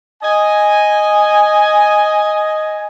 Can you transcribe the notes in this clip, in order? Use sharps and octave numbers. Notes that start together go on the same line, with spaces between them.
D#5 G#5